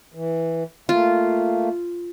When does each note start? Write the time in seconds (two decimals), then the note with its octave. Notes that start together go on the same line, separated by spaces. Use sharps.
0.14 E3
0.89 A3 A#3 F4